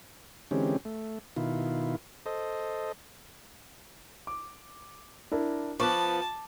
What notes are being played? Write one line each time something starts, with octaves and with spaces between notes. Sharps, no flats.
D3 E3 G#3 C4 C#4 G4
A3
B2 D#3 E4 F4
A4 C5 D#5
D6
D4 E4 A#4
F3 B3 B4 A5 C#6 D6